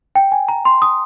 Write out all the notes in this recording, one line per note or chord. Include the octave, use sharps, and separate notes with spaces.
G5
G#5
A#5
C6
D#6